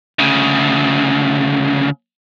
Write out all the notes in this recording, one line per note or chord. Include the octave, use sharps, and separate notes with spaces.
D2 C#3